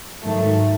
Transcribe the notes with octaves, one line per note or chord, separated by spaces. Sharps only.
G#2 D#3 F#3 A3